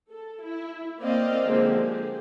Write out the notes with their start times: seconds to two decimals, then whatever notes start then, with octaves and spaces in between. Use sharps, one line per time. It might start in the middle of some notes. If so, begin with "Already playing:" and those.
0.11 A4
0.41 E4
1.01 A#3 C4 D5 D#5 F5
1.45 D3 F3 G#3 A#3 C4 D#4
1.79 G4 G#4